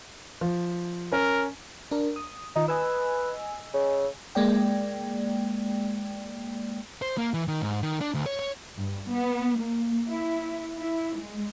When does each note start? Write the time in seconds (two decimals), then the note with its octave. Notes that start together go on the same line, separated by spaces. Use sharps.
0.41 F3
1.12 C#4 A#4
1.91 D4 A#4
2.16 D#6
2.56 D#3 D#4 F4
2.68 B4 D#5 G#5 E6
3.74 C#3
4.35 G#3 A#3 D5 G5
7.02 C5
7.18 A#3
7.34 E3
7.48 D#3
7.62 G#2
7.82 D#3
8.01 D4
8.14 D2
8.26 C#5
8.39 C#5
8.76 G2
9.08 B3
9.57 A#3
10.09 E4
10.77 E4
11.18 G#3